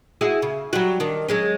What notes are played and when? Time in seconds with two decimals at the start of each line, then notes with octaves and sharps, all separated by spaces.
0.21 E4 F#4 G#4
0.42 C#3
0.73 F#3 G3 F#4
1.00 D#3 D4
1.29 F#3 G#3 C#4